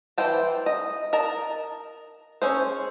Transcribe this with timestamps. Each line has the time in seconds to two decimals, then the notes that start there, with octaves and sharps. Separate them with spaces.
0.18 E3 C5 G5 A5
0.66 D#5
1.13 A#4 D#5 A5
2.42 C#4 G#4 A4 C5